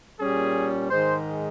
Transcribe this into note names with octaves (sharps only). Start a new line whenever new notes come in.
A#2 G3 C#4 G#4
G#2 D#3 G#3 C5